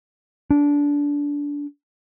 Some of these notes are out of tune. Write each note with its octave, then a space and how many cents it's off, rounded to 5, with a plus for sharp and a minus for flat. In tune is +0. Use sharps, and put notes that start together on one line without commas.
D4 -20